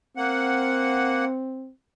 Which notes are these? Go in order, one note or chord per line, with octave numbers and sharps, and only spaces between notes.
A#3 C4 F#5